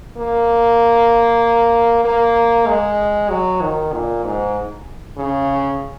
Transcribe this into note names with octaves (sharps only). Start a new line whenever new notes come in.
A#3
A#3
G#3
F#3
D#3
A#2
G#2
C#3